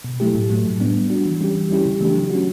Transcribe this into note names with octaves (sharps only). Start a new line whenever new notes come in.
B2
F#3 A3 E4 G4
A2
F#3 A3
A2
G3 B3 D4
G3
D4 F#4
E3
G3 C#4 G4
E3
G3 C#4 E4 G4
C#3
E3 A3 D4 G4
F#3
C#4 F#4